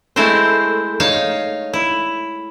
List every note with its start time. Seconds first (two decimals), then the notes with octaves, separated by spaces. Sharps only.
0.16 G#3 A3 C4 E4 A#4 C5
1.00 D#4 C#5 F5
1.74 E4